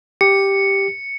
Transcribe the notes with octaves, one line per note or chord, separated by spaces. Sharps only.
G4 C#7